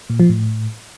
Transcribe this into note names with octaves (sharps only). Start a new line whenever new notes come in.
A#2
F3
A2